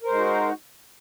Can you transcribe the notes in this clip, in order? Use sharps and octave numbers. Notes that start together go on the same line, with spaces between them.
G#3 D#4 F#4 A#4 C5